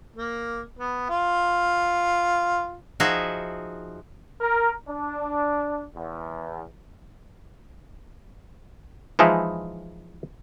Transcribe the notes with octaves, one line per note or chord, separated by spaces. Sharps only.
A#3
B3
F4
F3 D#4 F#4 G#4 E5
A#4
D4
E2
E3 F3 G#3 D#4 E4